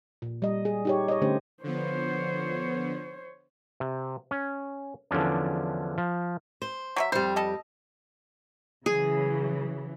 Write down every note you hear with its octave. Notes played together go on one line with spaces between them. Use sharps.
A#2
G3 D#5
G#4
D#4 G4 C#5
C#5 D#5
D3 A3 C#4 G4 C5
D3 F3 B3 C5 C#5
C3
C#4
E2 D3 F3 C#4 D4
F3
C5
F#3 G#4 E5
F2 G3 C5
A4 D#5
C#3 E3 F#3 G#4